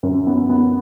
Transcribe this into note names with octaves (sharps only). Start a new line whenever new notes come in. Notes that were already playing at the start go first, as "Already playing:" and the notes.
F#2
B3
B3